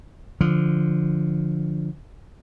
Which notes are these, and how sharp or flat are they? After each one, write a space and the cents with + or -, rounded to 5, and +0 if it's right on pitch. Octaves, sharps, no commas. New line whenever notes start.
D3 +5 F3 +0